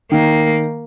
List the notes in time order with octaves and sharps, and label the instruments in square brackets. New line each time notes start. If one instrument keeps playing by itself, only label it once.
[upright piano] D#3 [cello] A#3